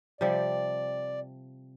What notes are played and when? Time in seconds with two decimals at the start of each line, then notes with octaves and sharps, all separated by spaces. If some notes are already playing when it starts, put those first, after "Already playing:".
0.21 C3 F3 G3 D5